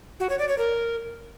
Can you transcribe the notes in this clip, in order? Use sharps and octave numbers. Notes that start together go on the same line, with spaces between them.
F#4
C#5
D5
C#5
A#4